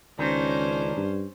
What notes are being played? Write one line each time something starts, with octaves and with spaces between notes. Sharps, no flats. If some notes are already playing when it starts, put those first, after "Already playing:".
C#2 D#3 C#4 D4 C5
G2